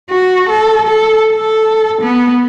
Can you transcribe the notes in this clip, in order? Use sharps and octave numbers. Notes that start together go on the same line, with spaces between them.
F#4
A4
A4
A4
B3